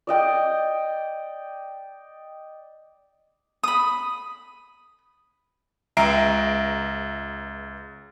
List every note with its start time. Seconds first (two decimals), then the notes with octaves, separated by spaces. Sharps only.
0.07 D5 D#5 G5
3.63 B5 D#6
5.97 C#2 E5 A#5 C7 D7